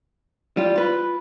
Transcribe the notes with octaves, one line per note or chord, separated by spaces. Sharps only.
G3 F4
F4 B4